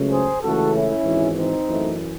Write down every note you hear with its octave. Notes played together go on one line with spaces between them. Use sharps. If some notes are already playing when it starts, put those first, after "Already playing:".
Already playing: C#2 C#3 F#3 A3
G#4 C5
C#2 C#3 E3 A3 F#4 A4
C#4 E4
G#1 G#2 E3
C4 D#4
F#2 E3 A3